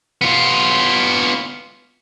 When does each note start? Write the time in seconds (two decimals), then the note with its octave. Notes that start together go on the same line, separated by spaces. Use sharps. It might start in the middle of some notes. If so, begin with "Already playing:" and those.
0.21 B3 F4